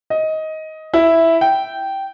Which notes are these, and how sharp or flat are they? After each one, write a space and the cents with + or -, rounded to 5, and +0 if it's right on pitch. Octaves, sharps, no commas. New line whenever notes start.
D#5 +15
E4 +0
G5 -10